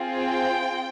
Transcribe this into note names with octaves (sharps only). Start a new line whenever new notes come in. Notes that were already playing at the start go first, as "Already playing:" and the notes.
Already playing: C4 F4 G#4
G5